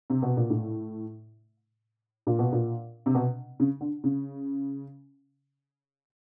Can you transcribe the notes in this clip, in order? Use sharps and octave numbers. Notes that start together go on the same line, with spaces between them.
C3
B2
A#2
A2
A#2
B2
A#2
C3
B2
C#3
D3
C#3